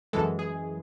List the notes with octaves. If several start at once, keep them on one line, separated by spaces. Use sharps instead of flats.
F#2 E3 G#3 A4
G#4